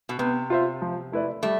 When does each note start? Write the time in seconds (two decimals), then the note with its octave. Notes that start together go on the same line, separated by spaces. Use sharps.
0.09 B2
0.19 C3 B3
0.50 F4 C5 E5
0.82 F3
1.12 A3 E4 B4 D5
1.43 G3 A3